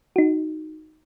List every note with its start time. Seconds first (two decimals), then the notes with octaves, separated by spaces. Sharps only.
0.16 D#4 F#4